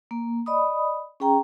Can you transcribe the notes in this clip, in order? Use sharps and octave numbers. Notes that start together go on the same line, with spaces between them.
A#3
D5 D#5 B5 D#6
C#4 G#4 G5 A#5